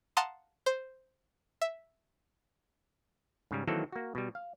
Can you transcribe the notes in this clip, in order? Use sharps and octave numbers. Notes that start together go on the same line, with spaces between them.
F5 F#5 A5 A#5 C6 D#6
C5
E5
G#2 C#3 G3
D#3 E3 F#3 A#3 C4 A4
A#3 F#4
B2 G3
F5